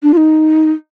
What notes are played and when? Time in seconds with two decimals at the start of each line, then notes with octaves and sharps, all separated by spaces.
0.03 D4
0.14 F4
0.17 D#4